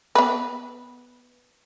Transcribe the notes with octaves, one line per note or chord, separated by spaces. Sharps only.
B3 B4